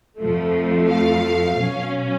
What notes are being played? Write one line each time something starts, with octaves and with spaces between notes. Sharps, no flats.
F2 F3 A3
F5
B2 F#3 C#4